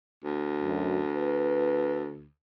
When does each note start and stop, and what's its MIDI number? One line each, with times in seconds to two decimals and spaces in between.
0.24 2.27 38
0.63 1.00 42
1.14 2.04 71